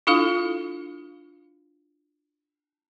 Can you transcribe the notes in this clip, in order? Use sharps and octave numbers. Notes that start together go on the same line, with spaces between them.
D4 E4 F4 A4 F5